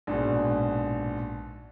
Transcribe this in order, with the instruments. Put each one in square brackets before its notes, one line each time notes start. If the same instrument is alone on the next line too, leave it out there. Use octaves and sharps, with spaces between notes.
[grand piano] A#1 G#2 B2